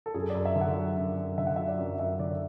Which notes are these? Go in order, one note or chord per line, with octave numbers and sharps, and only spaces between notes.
A4
F#2 G#4
D5
F#2
E5
D3
F#5
F#3
F#2
F#2
D3 E5
F#5
F#3 E5
D5
F#2
F#2 E5
D3 D5